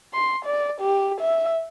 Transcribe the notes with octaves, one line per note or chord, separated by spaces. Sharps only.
C6
D5
G4
E5